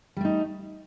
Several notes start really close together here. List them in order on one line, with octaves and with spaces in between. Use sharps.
G3 A3 D#4